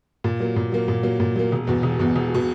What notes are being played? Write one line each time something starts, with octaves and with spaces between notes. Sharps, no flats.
A#2
F#3 A#3
A#2
F#3 A#3
A#2
F#3 A#3
A#2
F#3 A#3
E1
E2 B2
E1
E2 B2
E1
B2